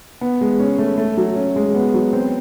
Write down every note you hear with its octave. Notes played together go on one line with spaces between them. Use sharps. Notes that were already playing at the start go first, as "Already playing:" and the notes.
B3
G#3
C#4
A3
A3
F#3
C#4
G#3
B3
F#3
C4